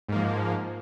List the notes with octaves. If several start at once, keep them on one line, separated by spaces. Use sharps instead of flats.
G#2 F3 A#3